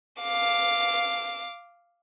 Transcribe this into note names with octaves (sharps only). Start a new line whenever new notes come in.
F5 D6